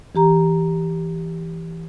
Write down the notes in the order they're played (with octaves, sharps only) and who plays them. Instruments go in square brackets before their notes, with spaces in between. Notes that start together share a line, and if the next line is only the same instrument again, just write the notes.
[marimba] E3 G4 A#5